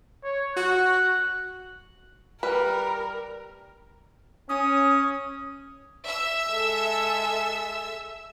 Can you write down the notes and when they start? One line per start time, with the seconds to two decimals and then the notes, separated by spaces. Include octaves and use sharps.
0.24 C#5
0.56 F#4 F#6
2.43 G3 A#4 B4
4.49 C#4 D#6
6.05 E5 E6
6.49 G#3 A4